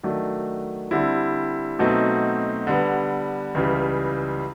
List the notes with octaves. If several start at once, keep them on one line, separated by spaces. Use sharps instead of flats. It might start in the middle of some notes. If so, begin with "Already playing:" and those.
D#3 F#3 A3 D4
D3 G3 C4 E4
B2 F#3 A3 C4 D#4
D3 G3 B3
C#2 C#3 E3 G3